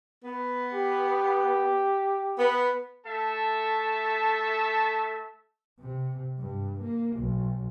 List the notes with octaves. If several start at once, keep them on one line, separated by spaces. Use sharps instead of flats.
B3
G4
B3
A3 A4 E5 A5
C3
G2
A#3
B1